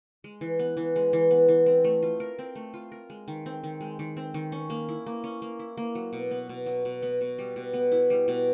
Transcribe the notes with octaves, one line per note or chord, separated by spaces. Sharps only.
G#3
E3
B3
E3
G#3
E3
B3
E3
C4
A3
F4
A#4
C4
A3
F4
A#4
G#3
D#3
C4
D#3
G#3
D#3
C4
D#3
C#4
A#3
E4
A#3
C#4
A#3
E4
A#3
F#3
B2
B3
B2
F#3
B2
B3
B2
G3
B2
B3
E4
G3
B2